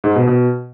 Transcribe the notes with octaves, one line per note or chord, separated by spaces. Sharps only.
G#2
B2
B2